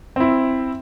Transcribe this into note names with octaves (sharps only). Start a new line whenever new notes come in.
C4 E4